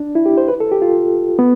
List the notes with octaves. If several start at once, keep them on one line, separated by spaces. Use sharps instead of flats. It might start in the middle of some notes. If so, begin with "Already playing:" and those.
Already playing: D4
E4
G4
C5
B4
A4
G4
F4
B3